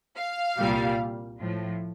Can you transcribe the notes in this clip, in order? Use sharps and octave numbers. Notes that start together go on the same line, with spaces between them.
F5
C2 A#2 G3
A2 F3